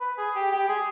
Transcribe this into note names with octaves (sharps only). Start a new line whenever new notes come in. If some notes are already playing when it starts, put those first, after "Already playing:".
B4
G#4
G4
G4
G#4